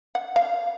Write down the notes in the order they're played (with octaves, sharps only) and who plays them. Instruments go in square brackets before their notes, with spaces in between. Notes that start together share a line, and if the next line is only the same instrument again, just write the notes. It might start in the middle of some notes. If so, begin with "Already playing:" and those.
[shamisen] F#5
F5